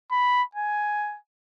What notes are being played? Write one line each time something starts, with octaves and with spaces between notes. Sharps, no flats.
B5
G#5